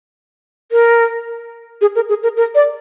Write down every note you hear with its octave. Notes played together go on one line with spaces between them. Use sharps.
A#4
G#4
A#4
G#4
A#4
A#4
D5